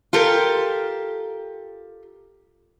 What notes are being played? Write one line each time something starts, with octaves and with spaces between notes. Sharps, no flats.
F4 G4 A4 A#4